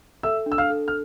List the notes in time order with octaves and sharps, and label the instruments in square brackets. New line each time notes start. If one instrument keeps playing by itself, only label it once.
[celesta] A4 [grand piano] E5 E6
[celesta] D4
[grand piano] E6
F5 F6
[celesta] A4
[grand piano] F6